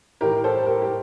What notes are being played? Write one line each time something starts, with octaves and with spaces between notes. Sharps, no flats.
A2 E3 G4 A#4
A4 C5
G4 A#4
G4